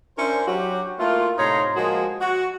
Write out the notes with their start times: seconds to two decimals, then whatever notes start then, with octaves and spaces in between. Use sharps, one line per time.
0.18 C#4 D4 E4 A#4 C5
0.47 F#3 F#4 G4
0.99 A3 A#3 E4 F4
1.37 A2 C3 D#4 C#5 A#5 C6
1.76 F3 G#3 A#3 F#4 G#4
2.20 F#4